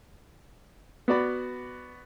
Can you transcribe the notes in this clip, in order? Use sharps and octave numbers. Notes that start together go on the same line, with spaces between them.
B3 F#4 D5 B5